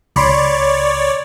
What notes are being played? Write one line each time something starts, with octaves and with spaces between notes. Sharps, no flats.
C#2 C#5 D5 B5 C6